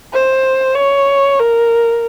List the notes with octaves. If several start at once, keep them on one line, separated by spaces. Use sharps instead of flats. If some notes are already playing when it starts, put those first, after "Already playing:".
C5
C#5
A#4